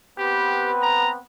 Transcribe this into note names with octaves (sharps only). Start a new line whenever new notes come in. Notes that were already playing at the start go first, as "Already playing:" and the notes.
B3 C4 G4 B4
A#5